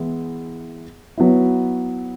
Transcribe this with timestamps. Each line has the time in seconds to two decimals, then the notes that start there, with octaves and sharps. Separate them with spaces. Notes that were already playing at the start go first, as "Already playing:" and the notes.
Already playing: E3 G#3 B3 E4
1.18 F#3 B3 E4